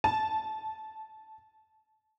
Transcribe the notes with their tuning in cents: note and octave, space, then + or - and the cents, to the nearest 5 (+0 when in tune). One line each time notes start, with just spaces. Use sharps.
A5 -20